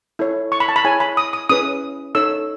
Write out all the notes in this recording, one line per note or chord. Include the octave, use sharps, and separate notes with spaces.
E4 A4 C#5
C#6
B5
A5
B5
E4 G#4 C#5 G#5
B5
D#6
D#6
C#4 E4 G#4 B4 D#6
D#4 A4 C#5 E6